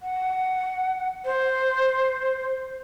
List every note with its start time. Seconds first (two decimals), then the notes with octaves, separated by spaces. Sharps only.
0.02 F#5
1.25 C5